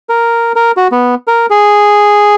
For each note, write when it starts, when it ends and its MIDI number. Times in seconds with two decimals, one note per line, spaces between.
0.09 0.52 70
0.56 0.71 70
0.77 0.88 66
0.92 1.15 59
1.27 1.46 70
1.50 2.35 68